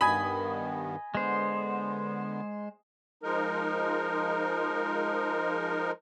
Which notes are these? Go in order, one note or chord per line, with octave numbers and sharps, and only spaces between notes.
G2 D#3 B3 D#5 G#5 B5
D3 G#3 B3 C5
F3 G#3 D#4 A#4